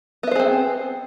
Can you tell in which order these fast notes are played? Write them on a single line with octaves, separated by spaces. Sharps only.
B3 E5 C5 G#4 C4